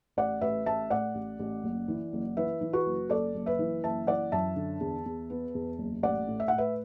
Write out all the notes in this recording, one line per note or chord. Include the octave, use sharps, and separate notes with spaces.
A1 D5 F#5
A1 B4 E5
A1 E5 A5
A2 D5 F#5
A1
A1
F#1
E3
F#1
E3 B4 E5
E3
F#4 B4
F#1
F#1 A4 D5
F#1
B4 E5
E3
F#1 E5 A5
E3 D5 F#5
F#2 E5 A5
D3
E2
E2
B3
E2
F#1
A1 D5 F#5
A2
E5
A2 F#5
B4 E5